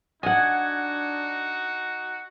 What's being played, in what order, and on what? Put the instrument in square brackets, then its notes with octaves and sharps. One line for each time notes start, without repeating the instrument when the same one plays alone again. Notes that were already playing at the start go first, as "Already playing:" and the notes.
[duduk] D4 [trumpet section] D#4 F#4 [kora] D#5 F#5 [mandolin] G#5